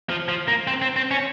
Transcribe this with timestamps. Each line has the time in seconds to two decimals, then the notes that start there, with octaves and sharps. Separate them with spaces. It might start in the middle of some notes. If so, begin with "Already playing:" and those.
0.09 F3
0.28 F3
0.48 A#3
0.67 C4
0.82 C4
0.96 C4
1.11 C#4